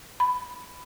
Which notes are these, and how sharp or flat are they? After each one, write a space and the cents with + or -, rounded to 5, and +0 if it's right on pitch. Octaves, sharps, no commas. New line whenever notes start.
B5 +10